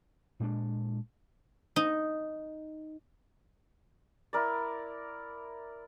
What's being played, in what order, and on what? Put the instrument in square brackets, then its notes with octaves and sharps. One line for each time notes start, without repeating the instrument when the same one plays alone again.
[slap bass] A#2 G#3 D4
[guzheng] D#4
[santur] E4 A#4 D5